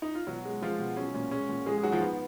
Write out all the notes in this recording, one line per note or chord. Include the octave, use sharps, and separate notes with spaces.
D#4
F4
B2 F#3 F#4
G#3
F3 G#3 F4
B2
F#3 C#4
A#2 C#4
G#3 C#4
A#2
F3 G#3 G#4
G#4
G#2 F#3 F#4
F3 F4
G#2 B3